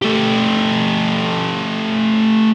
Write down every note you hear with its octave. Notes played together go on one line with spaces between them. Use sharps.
A3 G4